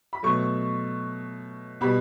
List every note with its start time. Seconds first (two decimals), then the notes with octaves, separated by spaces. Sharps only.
0.13 B5
0.23 B2 F#3 A3 C#6
1.81 B2 G3 B5